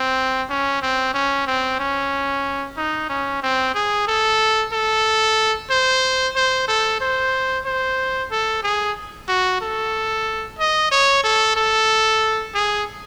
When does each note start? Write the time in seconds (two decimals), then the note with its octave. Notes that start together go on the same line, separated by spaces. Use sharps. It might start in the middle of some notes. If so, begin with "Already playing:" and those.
Already playing: C4
0.50 C#4
0.82 C4
1.14 C#4
1.47 C4
1.80 C#4
2.77 D#4
3.09 C#4
3.42 C4
3.74 G#4
4.07 A4
4.73 A4
5.70 C5
6.36 C5
6.68 A4
7.01 C5
7.65 C5
8.31 A4
8.63 G#4
9.29 F#4
9.61 A4
10.59 D#5
10.91 C#5
11.24 A4
11.56 A4
12.55 G#4